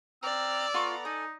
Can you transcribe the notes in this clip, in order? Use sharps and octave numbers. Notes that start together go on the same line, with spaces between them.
C4 D5 A#5 E6 F6
B3 F4 A4 A#5 C#6
D#4 A4 G#5 D#6